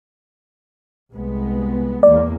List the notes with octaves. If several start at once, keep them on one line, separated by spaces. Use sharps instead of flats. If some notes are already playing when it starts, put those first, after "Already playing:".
C2 G#3 B3
E2 A#3 D5